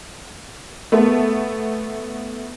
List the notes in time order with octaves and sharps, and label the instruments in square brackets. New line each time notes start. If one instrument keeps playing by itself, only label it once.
[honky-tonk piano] A3 B3